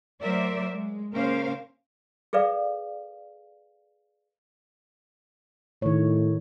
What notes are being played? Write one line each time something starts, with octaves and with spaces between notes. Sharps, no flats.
F#3 A3 A#4 C5 D5 E5
G#3
C#3 A#3 C#4 A#4 C5 F5
G#4 A4 B4 D5 F5
A2 D#3 C#5